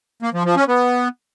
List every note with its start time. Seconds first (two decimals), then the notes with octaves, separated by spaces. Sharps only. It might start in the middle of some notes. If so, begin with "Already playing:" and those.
0.22 A#3
0.34 F3
0.45 F3
0.56 C#4
0.68 B3